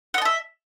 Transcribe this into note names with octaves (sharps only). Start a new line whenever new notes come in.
D#5 E5 F#5 A5